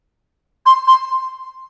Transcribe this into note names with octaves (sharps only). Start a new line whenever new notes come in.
C6
C6